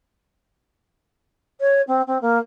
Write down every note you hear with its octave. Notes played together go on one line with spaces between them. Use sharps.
C#5
C4
C4
A#3